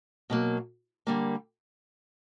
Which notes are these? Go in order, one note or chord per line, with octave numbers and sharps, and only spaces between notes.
B2 F#3 A#3
D3 G3 A#3